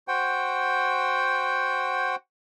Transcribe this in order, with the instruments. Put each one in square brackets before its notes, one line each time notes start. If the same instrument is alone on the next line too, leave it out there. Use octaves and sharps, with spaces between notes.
[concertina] F#4 C5 F#5 G5